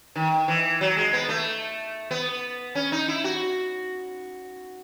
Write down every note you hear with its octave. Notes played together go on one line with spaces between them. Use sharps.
D#3
E3
F#3
G#3
B3
A3
B3
C#4
D#4
E4
F#4